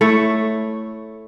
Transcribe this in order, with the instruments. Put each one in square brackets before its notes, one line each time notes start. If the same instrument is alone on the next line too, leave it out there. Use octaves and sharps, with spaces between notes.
[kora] A3 E4 C#5